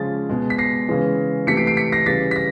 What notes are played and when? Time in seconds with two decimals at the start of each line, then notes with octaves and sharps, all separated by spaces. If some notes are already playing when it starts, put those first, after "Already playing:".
Already playing: C#3 F3 G#3 A6
0.29 B2 G#3
0.50 B6
0.58 A#6 C7
0.88 C#3 E3 G#3
1.47 C3 E3 A3 B6 C#7
1.57 C7 D7
1.67 C7 D7
1.77 B6 C#7
1.92 A#6 C7
2.06 C#3 E3 G3 A6 B6
2.31 B6
2.36 A#6